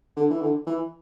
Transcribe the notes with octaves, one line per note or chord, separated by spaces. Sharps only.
D3
E3
D3
E3